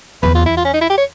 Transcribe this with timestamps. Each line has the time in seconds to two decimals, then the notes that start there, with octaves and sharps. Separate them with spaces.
0.23 E2 B4
0.35 F4
0.46 E4
0.57 F4
0.65 C#4
0.74 D#4
0.81 E4
0.90 G4
0.98 C#5